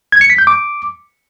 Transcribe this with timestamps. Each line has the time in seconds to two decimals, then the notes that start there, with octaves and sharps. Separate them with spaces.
0.12 G#6
0.21 C#7
0.30 B6
0.38 G6
0.47 D6